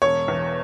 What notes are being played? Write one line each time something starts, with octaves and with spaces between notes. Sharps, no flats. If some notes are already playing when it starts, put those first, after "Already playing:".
E1 C#5
E2